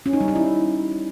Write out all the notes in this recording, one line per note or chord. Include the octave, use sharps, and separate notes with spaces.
C#4
D#4
G3
D#4
E4